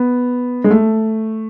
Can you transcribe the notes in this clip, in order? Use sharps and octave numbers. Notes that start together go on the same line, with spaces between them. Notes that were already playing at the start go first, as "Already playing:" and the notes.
Already playing: B3
G#3
A3